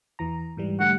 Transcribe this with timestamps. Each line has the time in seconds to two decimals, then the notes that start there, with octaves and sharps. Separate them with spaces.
0.19 E2 E3 A#5
0.57 G#2 E3 G3
0.80 D3 G3 A3 F#5